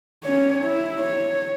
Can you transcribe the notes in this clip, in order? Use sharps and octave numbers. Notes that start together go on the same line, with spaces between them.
C#4 C#5
E4
C#5